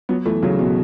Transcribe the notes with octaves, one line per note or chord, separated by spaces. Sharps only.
F#3 B3
E3 A3
C#3 F#3
B2